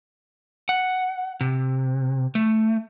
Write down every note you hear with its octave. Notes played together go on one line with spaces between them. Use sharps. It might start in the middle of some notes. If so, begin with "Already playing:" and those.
F#5
C3
A3